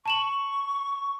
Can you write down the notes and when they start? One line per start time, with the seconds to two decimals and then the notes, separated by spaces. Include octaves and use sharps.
0.06 A5 C#6 E7 F#7